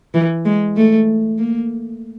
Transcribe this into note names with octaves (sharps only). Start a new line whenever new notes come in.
E3
G#3
A3
A#3